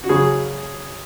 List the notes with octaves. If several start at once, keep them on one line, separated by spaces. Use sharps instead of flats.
F#4
C#3 F#3 G#4